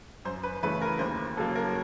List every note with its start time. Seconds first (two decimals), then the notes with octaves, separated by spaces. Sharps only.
0.25 F#2 C5
0.43 B4
0.63 C#3 E3 A3 B4
0.82 A#4
0.99 D#2 C5
1.37 C#3 F#3 A#3 A4
1.55 A#4